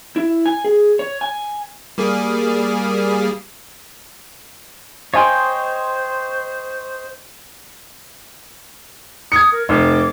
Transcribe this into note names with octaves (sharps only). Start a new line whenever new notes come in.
E4
G#5
G#4
C#5
G#5
G3 A#3 G#4
C5 C#5 D#5 F5 G5 G#5 C6
D#6 G#6 C#7
A#4
F1 D6